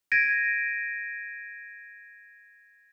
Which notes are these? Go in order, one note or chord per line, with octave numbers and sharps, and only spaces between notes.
G#6 A#6 D7 D#7